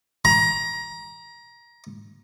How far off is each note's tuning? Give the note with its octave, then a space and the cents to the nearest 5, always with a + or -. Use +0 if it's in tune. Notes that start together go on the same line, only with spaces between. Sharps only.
A#5 +25